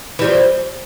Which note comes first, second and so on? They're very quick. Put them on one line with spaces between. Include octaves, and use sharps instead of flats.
E3 G3 F3